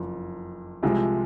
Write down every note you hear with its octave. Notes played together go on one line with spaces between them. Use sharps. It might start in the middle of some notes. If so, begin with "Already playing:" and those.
Already playing: F#1 F2
C2 C3 F3 G#3